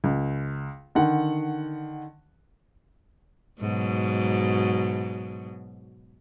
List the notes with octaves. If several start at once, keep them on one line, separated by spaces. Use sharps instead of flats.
C#2
D3 D#3 F#5
G#2 B2 F#3